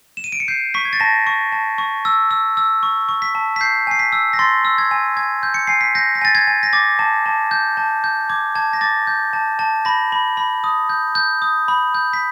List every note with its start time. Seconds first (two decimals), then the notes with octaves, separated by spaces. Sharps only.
0.17 E7
0.24 D#7
0.32 D7
0.40 C#7
0.48 G6 C7
0.74 C#6 B6
0.85 G#6
0.93 A6
1.00 A5 A#6
1.27 C#6
1.52 A5
1.78 C#6
2.05 E6
2.31 E6
2.57 E6
2.83 C#6
3.09 C#6
3.22 B6
3.35 A5
3.56 B6
3.61 G6 C7
3.87 G#5 C7
3.99 B6
4.12 E6
4.33 A#6
4.39 C6 A6
4.65 E6
4.78 G#6
4.91 G#5
5.17 G#5 G#6
5.43 G6
5.54 C#7
5.67 G#5 C7
5.81 B6
5.95 G6 A#6
6.15 A#6
6.22 G#5 A6
6.35 G#6
6.47 G#5
6.63 A#6
6.73 D6 A6
6.99 A5
7.26 A5
7.51 G6
7.77 A5
8.04 G6
8.30 D6 G#6
8.55 A5 G#6
8.73 A#6
8.81 D6 A6
9.07 G6
9.33 A5
9.59 A5
9.85 B5 A#6
10.12 B5
10.37 B5
10.64 D#6
10.89 G6
11.15 G6
11.42 D#6
11.68 B5
11.95 G6
12.13 B6